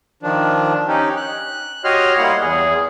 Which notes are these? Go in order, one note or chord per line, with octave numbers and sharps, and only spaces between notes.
D#3 F3 D4
C#4 D#4 G4
F#6
F#4 G4 C#5 D#5 C6 F6
G3 A#3 E4 F#5 C6
E2 G#4